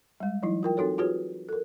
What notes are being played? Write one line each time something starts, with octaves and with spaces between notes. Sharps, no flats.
G3 G#3
E3 F#3 D#4 E4
F4 A#4 G5
C4 D#4 F#4 A4 C#5
F4 F#4 G#4 B4 C#5
A4 A#4